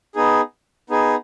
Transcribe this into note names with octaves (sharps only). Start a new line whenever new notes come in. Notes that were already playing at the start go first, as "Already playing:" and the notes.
B3 D#4 G#4
B3 D#4 G#4